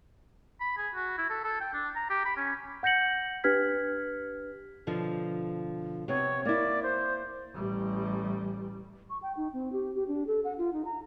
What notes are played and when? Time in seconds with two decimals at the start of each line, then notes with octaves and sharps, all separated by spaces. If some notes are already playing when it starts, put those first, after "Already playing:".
0.60 B5
0.77 G#4
0.95 F#4
1.18 E4
1.30 A4
1.44 A4
1.61 G5
1.73 D4
1.96 A#5
2.10 G4
2.26 B5
2.37 C#4
2.83 F#5 G6 A#6 C#7 F#7
3.44 D4 G4 B4 F6 G#6 B6
4.87 B2 D3 F3
6.08 C3 B3 C#5
6.45 A#3 E4 D5
6.83 C5
7.55 A1 G3
9.10 C#6
9.22 G5
9.37 D#4
9.53 C4
9.72 G4
9.95 G4
10.08 D4
10.27 A4
10.45 F#5
10.58 F4
10.73 D#4
10.85 A#5